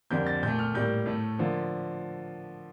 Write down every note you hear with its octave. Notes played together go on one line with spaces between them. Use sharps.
F2 D3 G3 A#3 G6
A6
A#2 A3 G6
F6
A2 G3 A#3 G6
A2 A3
D3 F3 A#3